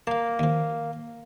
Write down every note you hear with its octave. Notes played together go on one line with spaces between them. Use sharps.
A#3 F5 A5
D#2 F3